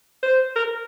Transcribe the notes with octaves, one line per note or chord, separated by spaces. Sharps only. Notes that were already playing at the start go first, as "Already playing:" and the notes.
C5
A#4